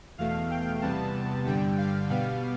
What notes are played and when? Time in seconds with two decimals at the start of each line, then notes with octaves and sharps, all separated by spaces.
0.18 E2 B2 A3 F5
0.51 G5
0.82 E2 C3 G3 B3 A5
1.45 G2 D3 G3 G5
1.78 F5
2.09 B2 G3 B3 F5